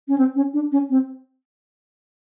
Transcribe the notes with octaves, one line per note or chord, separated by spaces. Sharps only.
C#4
C4
C#4
D4
C#4
C4